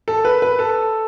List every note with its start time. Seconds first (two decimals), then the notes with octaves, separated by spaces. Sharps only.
0.08 A4
0.25 B4
0.42 B4
0.59 A4